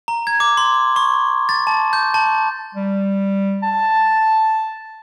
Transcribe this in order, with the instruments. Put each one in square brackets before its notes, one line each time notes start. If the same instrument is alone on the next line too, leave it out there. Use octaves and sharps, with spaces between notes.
[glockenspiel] A#5
G#6
D6
C6
C#6
A6
A5
G6
A5
[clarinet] G3
A5